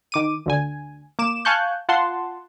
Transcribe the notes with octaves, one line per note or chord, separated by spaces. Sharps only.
D#3 D6 D#7
D2 D3 G#5
A#3 D6 E7
F5 G#5 A5 C#6 F#6 G6
F4 F#5 A5 C6